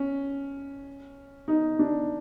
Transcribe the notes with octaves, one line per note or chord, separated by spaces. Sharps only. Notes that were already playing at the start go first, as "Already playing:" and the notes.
Already playing: C#4
D#4
D4